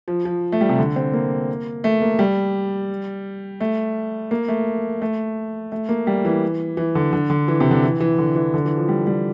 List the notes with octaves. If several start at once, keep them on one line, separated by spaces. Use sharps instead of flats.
F3
F3
A3
G3
C3
D3
C4
A#3
A3
A#3
G3
A3
A#3
A3
A3
A3
A#3
G3
E3
E3
D3
D3
D3
E3
C3
D3
E3
E3
D3
E3
D3
E3
F3
G3
G3